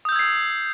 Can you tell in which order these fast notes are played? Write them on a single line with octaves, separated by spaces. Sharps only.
D#6 G6 E6 G#6 C7